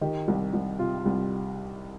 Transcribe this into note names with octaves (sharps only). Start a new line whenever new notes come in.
D#3 G4
C2
C2
C3 F4
C2